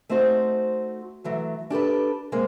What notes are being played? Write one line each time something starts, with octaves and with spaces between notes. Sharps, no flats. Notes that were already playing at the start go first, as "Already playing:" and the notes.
A3 C4 D#4 F#4 C5
E3 F#3 A3
D4 G4 A4 B4
G#3 A#3 C4